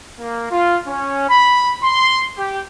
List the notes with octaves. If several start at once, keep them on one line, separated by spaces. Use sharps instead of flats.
A#3
F4
C#4
B5
C6
G4